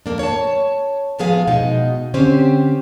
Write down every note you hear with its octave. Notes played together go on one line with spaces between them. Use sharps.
F2 A#3 D4
C#5 A5
F2 A2 F3 B3 G#4 F5
B2 G#3 D#4
D3 C4 C#4 G4 C5